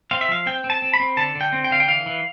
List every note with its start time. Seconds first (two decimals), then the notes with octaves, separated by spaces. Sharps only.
0.11 C4 F5
0.21 E5
0.29 F3 F5
0.46 C4 G5
0.64 C4
0.70 A5
0.82 C4
0.94 B5
1.00 C4
1.17 D3 A5
1.35 D3
1.41 G5
1.53 C4
1.64 G5
1.70 D3 F5
1.80 G5
1.88 E3 F5
2.06 E3